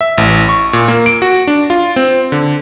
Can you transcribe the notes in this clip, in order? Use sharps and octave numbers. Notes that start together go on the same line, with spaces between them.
E5
A1
C#6
A#2
A#3
D7
F#4
D4
F4
C4
D3